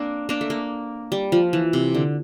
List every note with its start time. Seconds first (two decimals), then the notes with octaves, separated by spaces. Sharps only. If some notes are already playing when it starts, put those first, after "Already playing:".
Already playing: A#3 C4 D4
0.29 A#3 D4
0.41 A3
0.50 A#3
1.12 G3
1.32 F3
1.53 E3
1.73 C3
1.94 D3